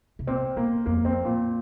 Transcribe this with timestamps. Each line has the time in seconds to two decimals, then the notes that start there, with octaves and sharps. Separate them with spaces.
0.19 C3
0.27 A#2 C4
0.56 A#2 A#3
0.86 F2 A#3
1.05 C4
1.25 A#2